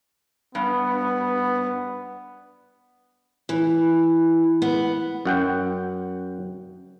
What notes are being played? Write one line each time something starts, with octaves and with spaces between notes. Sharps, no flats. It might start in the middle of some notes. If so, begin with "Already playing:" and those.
G2 B3
E3
B3
F#2 F#5 G5